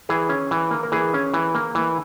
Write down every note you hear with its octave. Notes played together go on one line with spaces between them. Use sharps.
E3 G#4
C#4
E3
A#3
A#4
E3 G#4
C#4
E3
A#3
E3